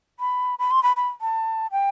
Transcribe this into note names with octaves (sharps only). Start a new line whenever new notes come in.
B5
B5
C6
B5
B5
A5
G5